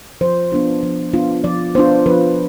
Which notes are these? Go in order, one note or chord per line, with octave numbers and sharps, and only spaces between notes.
F3 C5
B3 D4 F4
F3
B3 D4 F4
F3 D5
B3 D4 F4 C5
F3 B4